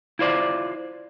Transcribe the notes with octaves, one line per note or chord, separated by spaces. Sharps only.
E4 F4 C5 D5